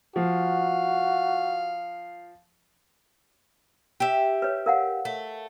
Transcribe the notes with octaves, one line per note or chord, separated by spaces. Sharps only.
F3 F#4 F5
G4 E5
B4 C#5
A#4 F5 F#5
A3